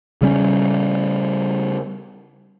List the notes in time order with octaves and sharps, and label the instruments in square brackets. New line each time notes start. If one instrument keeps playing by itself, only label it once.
[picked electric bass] C#3 G3 C#4